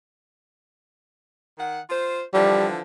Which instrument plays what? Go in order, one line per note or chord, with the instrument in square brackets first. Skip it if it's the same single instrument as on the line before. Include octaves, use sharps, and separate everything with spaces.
[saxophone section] D#3 F#5
F4 C5
[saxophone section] D3 E3 F3 [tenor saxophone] G3